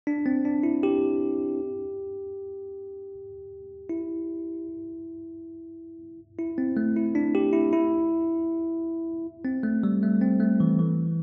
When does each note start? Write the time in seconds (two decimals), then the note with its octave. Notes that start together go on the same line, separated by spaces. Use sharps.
0.07 D4
0.26 C4
0.45 D4
0.63 E4
0.83 G4
3.89 E4
6.39 E4
6.58 C4
6.77 A3
6.96 E4
7.15 D4
7.35 G4
7.53 E4
7.73 E4
9.45 C4
9.63 A3
9.84 G3
10.03 A3
10.21 C4
10.40 A3
10.60 E3
10.79 E3